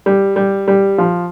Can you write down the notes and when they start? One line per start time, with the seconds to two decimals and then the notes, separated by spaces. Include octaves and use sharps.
0.06 G3
0.36 G3
0.68 G3
0.98 F3